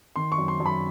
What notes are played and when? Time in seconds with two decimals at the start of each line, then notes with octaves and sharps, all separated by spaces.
0.16 D#3 C6
0.32 C#6
0.38 F#2
0.48 C6
0.60 F#2
0.66 B5